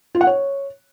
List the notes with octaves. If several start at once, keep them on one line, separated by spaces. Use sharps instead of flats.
F4
F#5
C#5